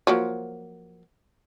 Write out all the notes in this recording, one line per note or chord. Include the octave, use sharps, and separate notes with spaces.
F3 F#3 A#3